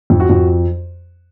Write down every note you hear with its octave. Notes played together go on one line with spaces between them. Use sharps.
F2
F#4
F2